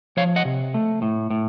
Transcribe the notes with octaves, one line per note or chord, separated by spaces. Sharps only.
F3 C#5 F5
D#5 F#5
C3
A3
A2
A2